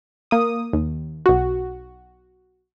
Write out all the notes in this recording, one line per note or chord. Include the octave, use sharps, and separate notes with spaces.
A#3 D#6
D#2
B1 F#4